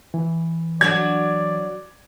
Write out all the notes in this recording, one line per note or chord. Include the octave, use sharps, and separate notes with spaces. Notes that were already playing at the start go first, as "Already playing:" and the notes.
E3
F#3 D4 F#4 D5 G#6